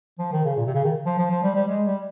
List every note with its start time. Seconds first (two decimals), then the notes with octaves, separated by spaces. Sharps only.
0.19 F3
0.33 D#3
0.45 C#3
0.57 A#2
0.66 C3
0.75 C#3
0.84 D#3
1.06 F3
1.19 F3
1.31 F3
1.43 G3
1.55 G3
1.68 G#3
1.86 G3